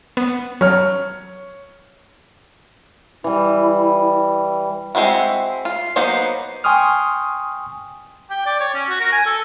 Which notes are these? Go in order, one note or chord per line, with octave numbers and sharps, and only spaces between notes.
B3
F#3 C#5 F6
E3 G3 E4
G#3 C4 E4 F#4
F4
F#3 A#3 B3 D#4 C5
G5 G#5 C6 C#6 D#6 F6
G5
D5
C#5
C#4
F#4
A#4
G#5
A4